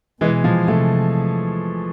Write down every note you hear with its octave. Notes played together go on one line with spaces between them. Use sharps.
B2 E3 G#3
F3
C3 F3 A3